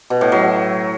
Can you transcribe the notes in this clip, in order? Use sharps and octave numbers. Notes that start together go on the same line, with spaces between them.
B2
A2
F#3